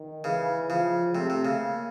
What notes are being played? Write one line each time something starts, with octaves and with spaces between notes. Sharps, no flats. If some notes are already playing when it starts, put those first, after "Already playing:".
Already playing: D#3
C#3 E3
C#3 F3
C3 A3
C3
C#3
A#3